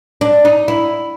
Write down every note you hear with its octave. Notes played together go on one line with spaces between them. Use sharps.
D4
D#4
E4